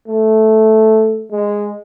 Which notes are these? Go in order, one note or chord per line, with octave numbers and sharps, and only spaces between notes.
A3
G#3